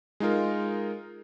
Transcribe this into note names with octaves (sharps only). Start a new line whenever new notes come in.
G#3 D#4 F4 A#4